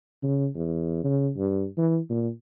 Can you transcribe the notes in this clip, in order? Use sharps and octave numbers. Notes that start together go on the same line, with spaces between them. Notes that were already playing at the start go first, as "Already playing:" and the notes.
C#3
E2
C#3
G2
E3
A#2